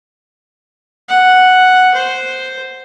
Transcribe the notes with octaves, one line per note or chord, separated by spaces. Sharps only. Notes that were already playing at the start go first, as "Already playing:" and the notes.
F#5
C5